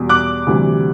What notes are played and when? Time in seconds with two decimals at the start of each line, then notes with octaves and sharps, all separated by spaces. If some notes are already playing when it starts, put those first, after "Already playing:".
Already playing: E2 B2 G3
0.09 D6 F#6
0.47 D2 C3 E3 G3